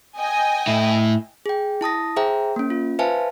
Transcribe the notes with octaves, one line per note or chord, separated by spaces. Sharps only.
D#5 G5 G#5
A2 E4
G#4 G5
E4 A5 D#6 A#6
G#4 C5 E5 G5 A#5
A#3 C#4
F4
B4 C5 E5 F5 G#5 A5